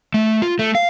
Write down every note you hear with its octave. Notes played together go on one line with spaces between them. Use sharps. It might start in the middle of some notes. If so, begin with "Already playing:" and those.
A3
F4
A3
F5